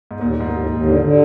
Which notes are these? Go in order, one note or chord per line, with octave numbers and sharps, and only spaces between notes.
G#2
D#2 A#2
D#2 G#2
A#2
D#2
D#2
D3
D3